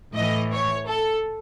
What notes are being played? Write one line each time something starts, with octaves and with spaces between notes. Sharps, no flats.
A2 E3 D#5
C#5
A4